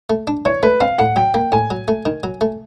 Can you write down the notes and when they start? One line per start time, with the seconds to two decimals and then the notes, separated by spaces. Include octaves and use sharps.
0.10 A3
0.27 D4
0.45 E3 C#5
0.63 A3 B4
0.81 C4 F5
0.98 A2 F#5
1.16 F#3 G5
1.34 A#3 G5
1.52 A2 G#5
1.70 F#3
1.88 A3
2.05 D#3
2.23 F#3
2.41 A3